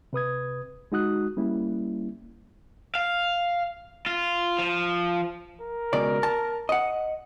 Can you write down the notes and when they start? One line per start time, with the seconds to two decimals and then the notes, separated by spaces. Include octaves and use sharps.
0.13 C3 B4 D#6 G#6
0.92 G#3 D#4 F#4 D#6 F#6
1.37 G3 A#3 C#4 E4
2.95 F5
4.06 F4
4.59 F3
5.61 A#4
5.93 C#2 B2 D5
6.23 A5
6.69 D#5 F#5